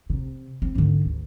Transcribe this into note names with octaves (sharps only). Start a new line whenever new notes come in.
C3
C4
G#2 D3
D2